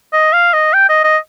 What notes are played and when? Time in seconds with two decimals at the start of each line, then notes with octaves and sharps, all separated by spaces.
0.13 D#5
0.33 F5
0.53 D#5
0.73 G5
0.89 D#5
1.04 D#5